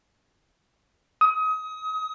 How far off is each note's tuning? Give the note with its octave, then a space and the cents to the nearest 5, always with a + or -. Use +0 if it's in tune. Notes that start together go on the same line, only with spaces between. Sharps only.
D#6 +30